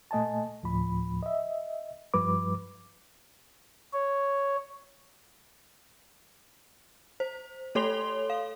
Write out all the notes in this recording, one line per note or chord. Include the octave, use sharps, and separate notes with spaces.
A#2 A3 D#5 G#5 A5
D2 A2 F3 B5
D#5 E5
G2 F3 G3 B4 D6
C#5
C5
A3 A4 C#5 C6 F7 G7
F5